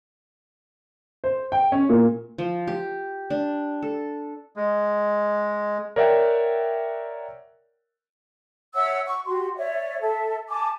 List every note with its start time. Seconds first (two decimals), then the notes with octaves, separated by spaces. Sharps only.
1.24 C5
1.52 G5
1.72 C#4
1.89 A#2
2.38 F3
2.67 G4
3.30 D4
3.82 A4
4.56 G#3
5.96 A#4 C#5 D5 E5 F#5 G5
8.75 C#5 E5 F#5 E6
9.06 C#6
9.26 F#4 G4 C6
9.56 C#5 D5 E5
10.01 A4 E5
10.49 G#5 A5 D6